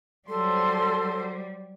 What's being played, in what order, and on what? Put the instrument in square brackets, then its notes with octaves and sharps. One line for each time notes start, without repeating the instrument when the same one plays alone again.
[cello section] F#3 C5 [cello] G3 [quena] A4 [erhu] C6